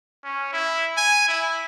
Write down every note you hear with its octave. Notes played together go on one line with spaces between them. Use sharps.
C#4
E4
G#5
E4